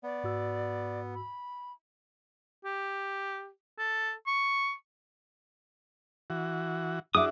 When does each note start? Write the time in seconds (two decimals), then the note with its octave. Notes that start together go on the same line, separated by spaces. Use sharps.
0.03 B3 D5
0.24 G#2 F#4 E6
1.14 B5
2.65 G4
3.78 A4
4.27 C#6
6.30 E3 F#4
7.15 D4 E4 F#4 G#4 E5 D6 D#6